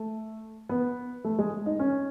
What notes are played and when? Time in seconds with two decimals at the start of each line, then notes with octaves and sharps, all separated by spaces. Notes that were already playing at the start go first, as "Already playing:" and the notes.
Already playing: A3
0.69 B3
1.24 A3
1.39 G#3
1.66 D#4
1.79 C#4